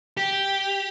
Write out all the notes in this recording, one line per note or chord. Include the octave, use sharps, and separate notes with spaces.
G4